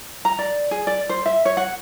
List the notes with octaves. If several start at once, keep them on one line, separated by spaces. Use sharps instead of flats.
A#5
D5
G#4
D5
C5
E5
C#5
F#5